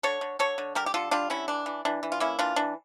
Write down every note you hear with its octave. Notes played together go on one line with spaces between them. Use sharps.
D3 A4 C#5
D3
D3 A4 C#5
D3
G3 G4 A#4
G4
D3 F4 A4
G3 D4 F4
D3 C#4 E4
E3 D4
E3
E3 D4
E3
F4
A#3 C#4 E4
E3 D4 F4
E3 D4